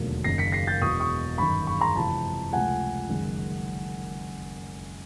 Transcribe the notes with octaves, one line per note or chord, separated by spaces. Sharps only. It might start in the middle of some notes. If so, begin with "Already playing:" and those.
Already playing: E1 D#2 D3 F#3 A3
F#1 F#2 D#3 A#6 C7
B6 C#7
A#6 C7
G6 A6
E1 E2 B2 C#6 D#6
C#6 D#6
G1 F#2 D#3 B5 C#6
B5 C#6
A#5 C6
F2 C3 E3 G#3 A5 B5
C#2 C3 F3 A3 F#5 G#5
F#1 F#2 D#3 G#3